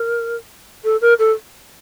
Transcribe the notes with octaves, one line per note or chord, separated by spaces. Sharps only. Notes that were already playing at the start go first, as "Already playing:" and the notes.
Already playing: A#4
A4
A#4
A4